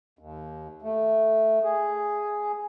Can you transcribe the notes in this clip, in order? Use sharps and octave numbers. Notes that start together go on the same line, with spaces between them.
D#2
A3
G#4